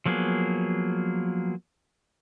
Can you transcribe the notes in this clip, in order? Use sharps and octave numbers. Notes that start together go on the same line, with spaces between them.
F3 F#3 A#3 B3 G#4